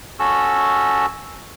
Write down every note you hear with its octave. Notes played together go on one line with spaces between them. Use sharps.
C#4 F#4 A4 E6